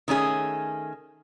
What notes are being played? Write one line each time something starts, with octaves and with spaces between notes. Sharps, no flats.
D#3 A3 C#4 G#4